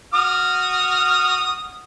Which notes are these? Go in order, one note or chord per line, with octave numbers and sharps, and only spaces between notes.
F#4 D#6 F6